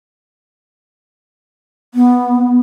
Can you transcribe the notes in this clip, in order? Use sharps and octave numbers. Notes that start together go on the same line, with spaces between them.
B3